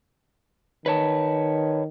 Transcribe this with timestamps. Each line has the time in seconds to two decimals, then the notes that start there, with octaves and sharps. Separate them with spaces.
0.86 D#3 B4 C#5 A5